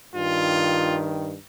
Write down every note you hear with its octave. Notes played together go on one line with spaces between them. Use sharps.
G2 D#3 F4